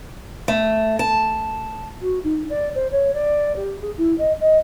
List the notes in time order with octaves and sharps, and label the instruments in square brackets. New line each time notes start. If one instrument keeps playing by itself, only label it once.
[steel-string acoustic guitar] A3
A5
[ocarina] F#4
D#4
D5
C5
C#5
D5
G4
G#4
E4
D#5
D#5